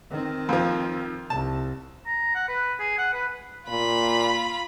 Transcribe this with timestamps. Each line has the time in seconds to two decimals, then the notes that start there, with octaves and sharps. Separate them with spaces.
0.11 D#3 C4
0.49 F2 F3
1.30 C2 A5
2.06 A#5
2.35 F#5
2.48 B4
2.80 G#4
2.98 F#5
3.14 B4
3.68 A#2 F4 B5